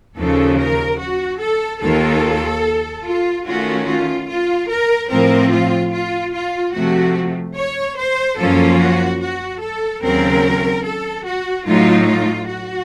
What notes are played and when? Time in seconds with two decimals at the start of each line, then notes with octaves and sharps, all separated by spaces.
0.17 D#2 C#3 F3 A4
0.59 A#4
0.99 F#4
1.40 A4
1.82 D#2 D#3 A#3 F4 A4
3.04 F4
3.46 D#3 A3 C#4 F4 F#4
3.87 F4
4.29 F4
4.69 A#4
5.10 A2 F3 C4 A#4
5.51 F4
5.92 F4
6.34 F4
6.74 C3 F3 A3 F#4
7.56 C#5
7.97 C5
8.38 F#2 F3 A#3 C#4 F4 A4
8.79 F#4
9.21 F#4
9.61 A4
10.03 D#2 C#3 F#3 C4 A#4
10.85 A4
11.25 F#4
11.66 A2 F#3 A3 D#4 F4
12.08 F4
12.49 F#4